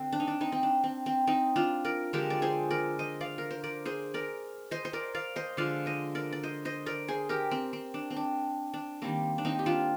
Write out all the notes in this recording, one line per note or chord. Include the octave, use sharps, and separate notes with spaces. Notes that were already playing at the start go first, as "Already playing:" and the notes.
Already playing: D3 C4
D4
D#4
D4
C4 D#4
C4
D4
C4
C4
C4 D#4
D4 F4
A#4 D5
D3 F3 G#3 G4 A#4
D5
G#4 C5
A#4 D5
C5 D#5
D5 F5
A#4
C5
A#4 D5
G#4 C5
A#4 D5
C5 D#5
C5
A#4 D5
D5 F5
C5 D#5
D3 F3 G#3 D5 F5
C5 D#5
A#4 D5
D5
C5 D#5
C5 D#5
A#4 D5
G#4 C5
G4 A#4
C4
C4
D4
C4
D4
D4
D#3 G3 A#3 C4
D4
C4 D#4
G4
D4 F4